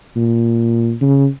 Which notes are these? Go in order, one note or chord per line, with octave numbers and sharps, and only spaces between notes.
A#2
C#3